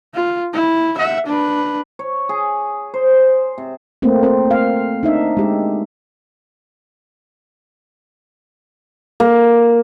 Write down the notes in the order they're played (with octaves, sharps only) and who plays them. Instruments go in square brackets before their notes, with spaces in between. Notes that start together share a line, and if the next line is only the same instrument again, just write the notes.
[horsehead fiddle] F4
E4
E5 F#5
D4 B4
[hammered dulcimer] C#5
G#4
C5
C3
[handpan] A3 A#3 C4
C4 A#4 C5
F5
D4 D#4 E5
G#3 G4
[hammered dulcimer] A#3